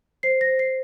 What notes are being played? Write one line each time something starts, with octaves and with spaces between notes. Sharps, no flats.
C5 C7
A#6
C5
C7